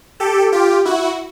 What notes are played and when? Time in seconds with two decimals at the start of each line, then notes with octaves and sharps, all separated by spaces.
0.20 G4 A4
0.52 F4 G4
0.85 E4 F#4